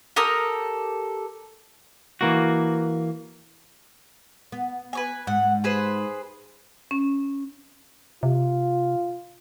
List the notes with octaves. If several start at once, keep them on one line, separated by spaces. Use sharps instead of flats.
G4 A4 A#4 D#6
E3 A#3 F#4
B3
B4 C#5 G#5
G#2 F#5
G#4 B4 C5
C#4
C3 F4